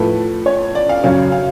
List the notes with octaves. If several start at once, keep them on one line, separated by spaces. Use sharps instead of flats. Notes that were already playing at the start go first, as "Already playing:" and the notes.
Already playing: A2 F3 A3 B4
C#5
D5
F5
F#2 C#3 F#3 C#4 F5
F5